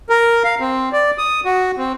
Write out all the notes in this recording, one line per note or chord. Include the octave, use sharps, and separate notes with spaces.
A#4
F5
C4
D5
D#6
F#4
C4